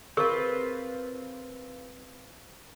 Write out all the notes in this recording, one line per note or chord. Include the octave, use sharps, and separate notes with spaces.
C4 F4 G#4 A#4 B4 C#6